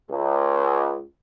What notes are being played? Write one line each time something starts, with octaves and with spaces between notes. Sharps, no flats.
C#2